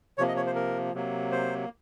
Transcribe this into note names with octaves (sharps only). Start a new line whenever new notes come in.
C3 F3 A#3 C#5
D#5
C#5
C5
A#4
C3 F#3 A#3
C5